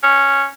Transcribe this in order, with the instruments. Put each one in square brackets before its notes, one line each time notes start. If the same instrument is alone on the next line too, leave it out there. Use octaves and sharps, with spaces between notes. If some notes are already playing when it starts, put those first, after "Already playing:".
[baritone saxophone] C#4